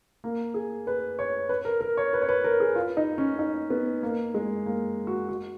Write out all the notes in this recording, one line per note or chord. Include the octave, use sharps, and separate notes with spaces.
A#3
G#4
B4
C#5
B4
A#4
A#4
C#5
B4
C#5
B4
A#4
G#4
F4
D#4
C#4
D#4
B3
A#3
G#3
A#3
F#4
F#4